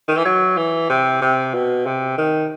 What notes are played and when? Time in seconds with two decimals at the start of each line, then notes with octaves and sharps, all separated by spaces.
0.08 D#3
0.17 E3
0.25 F#3
0.57 E3
0.90 C3
1.22 C3
1.54 B2
1.86 C3
2.18 D#3